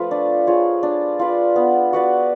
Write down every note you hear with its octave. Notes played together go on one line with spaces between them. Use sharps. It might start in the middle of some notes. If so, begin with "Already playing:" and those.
Already playing: F3 A3 F4 B4
D4
F4 G#4 C#5
D4
F4 B4 D5
B3
F#4 B4 D5